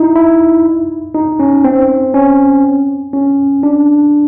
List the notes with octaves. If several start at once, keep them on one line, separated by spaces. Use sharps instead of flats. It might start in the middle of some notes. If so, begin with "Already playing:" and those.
Already playing: D#4 E4
E4
D#4
C#4
C4
C#4
C#4
D4